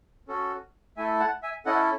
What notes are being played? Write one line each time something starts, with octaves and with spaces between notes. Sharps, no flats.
C#4 F#4 A4
A3 E4 A4 E5 G#5
F#5 A5
E5 G#5
C#4 E4 A4 D#5 F#5